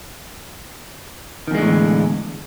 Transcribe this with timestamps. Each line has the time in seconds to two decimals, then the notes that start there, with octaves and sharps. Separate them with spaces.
1.48 D#3
1.51 E2
1.55 G#3
1.58 D3
1.61 A2